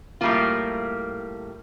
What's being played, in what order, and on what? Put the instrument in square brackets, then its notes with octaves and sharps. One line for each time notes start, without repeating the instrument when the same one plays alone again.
[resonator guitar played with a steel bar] A2 G3 A#3 F4